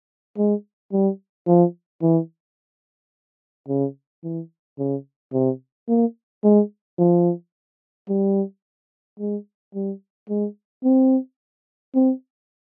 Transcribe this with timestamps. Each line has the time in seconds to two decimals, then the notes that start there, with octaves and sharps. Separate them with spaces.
0.38 G#3
0.92 G3
1.47 F3
2.02 E3
3.69 C#3
4.24 E3
4.79 C#3
5.33 C3
5.89 A#3
6.44 G#3
6.99 F3
8.09 G3
9.20 G#3
9.75 G3
10.29 G#3
10.84 C4
11.95 C4